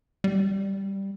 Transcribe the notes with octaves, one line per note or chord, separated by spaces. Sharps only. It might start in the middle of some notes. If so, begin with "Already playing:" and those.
G3